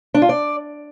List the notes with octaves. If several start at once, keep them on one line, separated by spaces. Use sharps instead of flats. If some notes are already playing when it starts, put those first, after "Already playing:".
D4
F4
D5